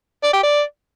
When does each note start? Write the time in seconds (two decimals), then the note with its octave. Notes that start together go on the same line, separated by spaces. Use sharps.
0.23 D5
0.33 G4
0.43 D5